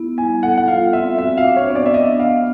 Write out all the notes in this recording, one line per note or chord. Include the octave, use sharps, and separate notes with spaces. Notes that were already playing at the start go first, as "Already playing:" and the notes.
Already playing: B3 E4
G3 G#5
A4 F#5
F#5
F4 F5
C4 E5
F#4 E5
F5
D4
C#5
B3
D5
E5
D4 D#5
B3 F5